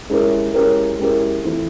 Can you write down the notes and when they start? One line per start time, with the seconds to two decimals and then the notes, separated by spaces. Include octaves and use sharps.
0.10 G#3 C#4 E4 G4 A#4
0.54 G#3 C#4 E4 G4 A#4
0.99 G#3 C#4 E4 G4 A#4
1.44 E3 A3 C4